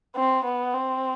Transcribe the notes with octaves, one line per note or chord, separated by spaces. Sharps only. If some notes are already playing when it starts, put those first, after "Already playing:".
C4
B3
C4